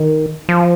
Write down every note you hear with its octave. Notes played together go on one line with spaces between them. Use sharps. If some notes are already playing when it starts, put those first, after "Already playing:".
Already playing: D#3
F3